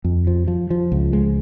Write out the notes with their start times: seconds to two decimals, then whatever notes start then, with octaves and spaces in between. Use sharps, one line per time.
0.04 F2
0.27 F3
0.48 F3
0.70 F3
0.92 C#2
1.13 G#3